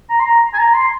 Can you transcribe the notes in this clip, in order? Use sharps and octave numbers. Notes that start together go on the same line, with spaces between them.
A#5
C6
A#5
G#5
A#5
C6